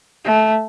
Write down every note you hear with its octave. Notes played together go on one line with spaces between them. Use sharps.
A3